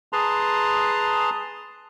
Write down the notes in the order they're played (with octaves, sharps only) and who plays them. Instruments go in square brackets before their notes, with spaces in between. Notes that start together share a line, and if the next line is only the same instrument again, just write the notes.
[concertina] G#4 B4 A5 A#5 C6